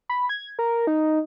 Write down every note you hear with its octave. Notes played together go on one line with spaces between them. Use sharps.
B5
G#6
A#4
D#4